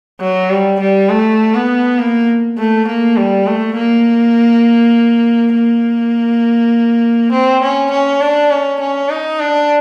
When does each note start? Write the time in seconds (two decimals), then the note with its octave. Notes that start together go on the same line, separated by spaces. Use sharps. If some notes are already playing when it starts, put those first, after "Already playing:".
0.21 F#3
0.50 G3
0.80 G3
1.10 A3
1.54 B3
1.99 A#3
2.58 A3
2.88 A#3
3.17 G3
3.47 A3
3.77 A#3
5.54 A#3
7.32 C4
7.62 C#4
7.91 C#4
8.21 D4
8.51 C#4
8.80 C#4
9.10 D#4
9.39 D4